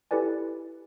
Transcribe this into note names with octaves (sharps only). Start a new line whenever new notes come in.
E4 G4 A4 B4 D5 G#5